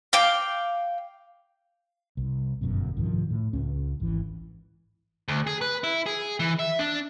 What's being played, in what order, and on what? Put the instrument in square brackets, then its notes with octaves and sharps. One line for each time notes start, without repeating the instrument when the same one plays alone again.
[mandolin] F5 G5 D6
[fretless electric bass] C2
G1 F#2 B2
C2 G#2 D#3 F3
A2
C#2 C#4
G#1 E3
[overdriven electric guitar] D2
G#4
B4
E4
G#4
E3
E5
D4